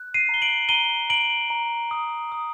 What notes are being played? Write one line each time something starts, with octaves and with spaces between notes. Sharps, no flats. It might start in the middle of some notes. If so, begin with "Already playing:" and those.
Already playing: F#6
C7 D#7
A#5
G7
D7 F#7
A#5 D#7 G7
A#5 D7 F#7
A#5
D#6
D#6